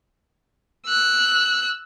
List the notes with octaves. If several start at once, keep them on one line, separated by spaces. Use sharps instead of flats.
E6 F#6